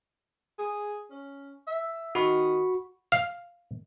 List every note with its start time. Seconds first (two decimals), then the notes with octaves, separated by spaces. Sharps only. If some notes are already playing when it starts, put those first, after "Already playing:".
0.58 G#4
1.10 C#4
1.67 E5
2.15 D#3 F#4 B5 C#6
3.12 F5